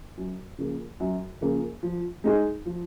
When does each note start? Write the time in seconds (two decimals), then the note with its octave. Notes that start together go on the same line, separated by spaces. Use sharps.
0.17 F#2
0.58 C#3 F3 A#3
1.00 F#2
1.41 C#3 F3 A#3
1.83 F3
2.24 G#3 D#4 G#4
2.66 F3